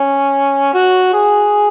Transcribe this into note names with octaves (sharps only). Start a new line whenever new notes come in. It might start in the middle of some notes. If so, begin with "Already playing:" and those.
Already playing: C#4
F#4
G#4